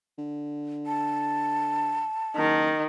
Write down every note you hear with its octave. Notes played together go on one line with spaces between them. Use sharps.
D3
A5
F#1 D#3